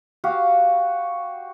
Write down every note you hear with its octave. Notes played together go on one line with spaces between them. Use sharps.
F#4 G4 F5